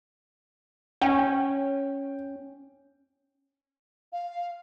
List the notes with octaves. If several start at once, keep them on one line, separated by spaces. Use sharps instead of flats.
C#4 G5
F5